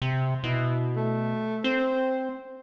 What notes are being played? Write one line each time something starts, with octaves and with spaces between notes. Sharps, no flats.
C3
B2 E4
A3
C4 C5